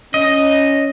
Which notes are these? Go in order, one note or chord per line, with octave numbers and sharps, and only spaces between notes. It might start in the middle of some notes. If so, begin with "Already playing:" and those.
C#4 D#5